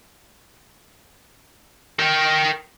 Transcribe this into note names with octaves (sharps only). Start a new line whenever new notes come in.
A#4 G5